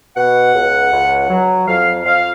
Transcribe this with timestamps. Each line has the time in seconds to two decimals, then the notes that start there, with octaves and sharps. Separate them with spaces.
0.17 B2 F#5
0.55 C#2
0.93 C#2
1.30 F#3
1.67 F2 F5
2.05 F2 F5